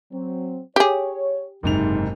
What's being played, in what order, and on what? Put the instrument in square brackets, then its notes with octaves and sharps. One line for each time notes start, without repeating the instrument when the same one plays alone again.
[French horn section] F#3 C4
[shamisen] G4 G#4 [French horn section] C#5
[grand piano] F#1 G#2 F7 [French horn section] C3 D#4